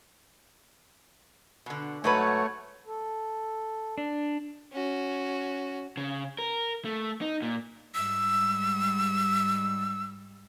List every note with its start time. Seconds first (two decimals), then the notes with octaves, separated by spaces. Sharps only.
1.66 B2 D3
2.04 G#2 F#3 A3 B4 C#5
2.86 A4
3.98 D4
4.72 C#4 F#4
5.97 C#3
6.39 A#4
6.85 A3
7.21 D#4
7.42 A#2
7.95 G#2 G3 E6